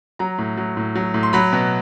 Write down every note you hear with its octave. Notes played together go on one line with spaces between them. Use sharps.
F#3 A#5
A2
F#3
A2
F#3
A2
C6
F#3 B5
B2